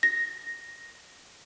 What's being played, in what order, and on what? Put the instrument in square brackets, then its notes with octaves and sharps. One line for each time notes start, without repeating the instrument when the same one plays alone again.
[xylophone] A#6